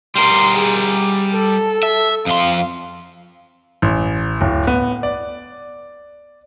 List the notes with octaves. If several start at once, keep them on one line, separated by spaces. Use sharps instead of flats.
G3 A#4 C6
G#4
A4
E5
F2 F5 C6
A1
D1
B3
D5